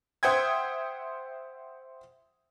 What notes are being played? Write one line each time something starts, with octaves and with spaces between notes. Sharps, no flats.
C5 E5 F#5 G5 D#6 G#6